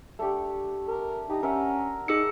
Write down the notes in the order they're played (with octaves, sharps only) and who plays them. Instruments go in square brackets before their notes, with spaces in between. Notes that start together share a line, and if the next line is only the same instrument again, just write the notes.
[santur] A3 D4 G4
[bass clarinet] A#4
[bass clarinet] D#4 [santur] G4 A#5
[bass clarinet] C#4 [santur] A#4 E5 F#5
[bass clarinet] D#4 [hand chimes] G#4 E6 C#7